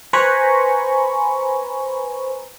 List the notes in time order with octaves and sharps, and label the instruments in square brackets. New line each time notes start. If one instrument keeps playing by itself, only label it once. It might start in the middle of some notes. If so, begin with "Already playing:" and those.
[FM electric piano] B4 C5 G#5 A#5 B5 C#6